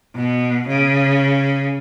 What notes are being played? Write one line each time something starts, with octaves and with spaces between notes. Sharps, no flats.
B2
C#3